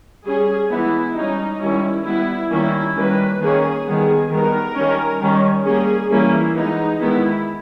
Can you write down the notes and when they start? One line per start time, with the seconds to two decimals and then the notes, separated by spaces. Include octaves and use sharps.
0.24 G3 C#4 G#4
0.70 E3 G#3 B3 E4
1.15 G3 C#4 D#4
1.60 D#3 G3 C#4 E4
2.05 G3 B3 E4
2.50 D#3 G3 A#3 C#4 E4
2.95 D#3 G3 A#3 C#4 B4
3.40 D#3 A#3 C#4 G#4
3.85 D#3 G3 B3 G#4
4.30 D#3 G3 B3 A#4
4.75 D#3 G3 C#4
5.21 D#3 G3 C#4
5.65 G3 A#3 C#4 G#4
6.10 E3 G3 A#3 C#4 E4
6.55 E3 G#3 B3 D#4
7.00 D#3 G#3 B3 E4